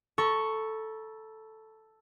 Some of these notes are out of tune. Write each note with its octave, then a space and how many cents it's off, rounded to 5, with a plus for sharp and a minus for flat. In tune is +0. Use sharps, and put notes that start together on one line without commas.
A4 +0 A#5 +45 C#6 +0